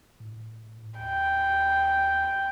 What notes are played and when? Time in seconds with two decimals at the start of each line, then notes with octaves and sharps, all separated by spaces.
0.20 A2
1.00 D#2 G5